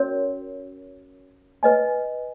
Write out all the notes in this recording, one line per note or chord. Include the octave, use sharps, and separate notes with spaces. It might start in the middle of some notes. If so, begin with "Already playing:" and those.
Already playing: C#4 F#4 A#4 C#5
B4 D#5 G#5